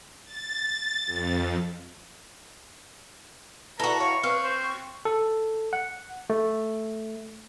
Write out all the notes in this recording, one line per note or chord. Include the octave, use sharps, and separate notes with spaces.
A6
F2
E4 F#4 A4 B4 A#5
C#5 F5 C#6
C4 B4 C#5 F5
C5 C#6
A4
F#5
A3